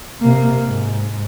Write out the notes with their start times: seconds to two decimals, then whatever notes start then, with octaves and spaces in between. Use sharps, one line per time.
0.21 C3 A#3
0.66 G#2